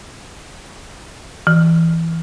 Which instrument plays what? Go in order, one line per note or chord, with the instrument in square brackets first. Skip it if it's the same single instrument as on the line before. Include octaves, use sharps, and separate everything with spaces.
[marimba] E3